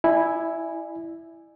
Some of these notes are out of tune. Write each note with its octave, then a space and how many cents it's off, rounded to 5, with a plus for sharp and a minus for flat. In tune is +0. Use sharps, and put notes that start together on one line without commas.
E4 +0 D5 +45 G#5 +0